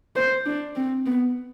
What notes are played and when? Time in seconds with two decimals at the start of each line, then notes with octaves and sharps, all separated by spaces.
0.16 C5
0.46 D4
0.76 C4
1.06 B3